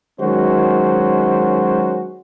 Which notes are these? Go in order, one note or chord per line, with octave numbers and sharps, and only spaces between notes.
D#3 F#3 G#3 C#4 F#4 C5